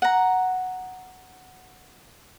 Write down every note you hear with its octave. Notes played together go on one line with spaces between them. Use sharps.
F#5 A#5